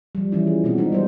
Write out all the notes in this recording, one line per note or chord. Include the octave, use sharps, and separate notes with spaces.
F3 G3
E3 F3 C#4 E4
G#4
B2 G#3 B3 C4 F#4
G#3 B3 D4 D#4 F4
G3 C5